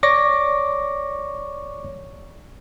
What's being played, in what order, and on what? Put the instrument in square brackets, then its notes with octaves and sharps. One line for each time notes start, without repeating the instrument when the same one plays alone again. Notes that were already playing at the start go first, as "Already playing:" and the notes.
[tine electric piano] C#5 D5 C#6 D6 A#6